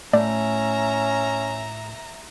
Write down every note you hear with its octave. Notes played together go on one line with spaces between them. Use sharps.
A2 C#4 D5 E5 A#5